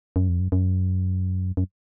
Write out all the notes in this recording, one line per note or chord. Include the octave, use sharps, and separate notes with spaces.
F#2
F2
F#2
F#2
F#2